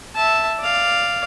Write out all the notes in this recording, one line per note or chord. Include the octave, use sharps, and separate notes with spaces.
E5 A5
D5 F5